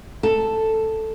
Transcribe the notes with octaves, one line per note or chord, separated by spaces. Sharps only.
A4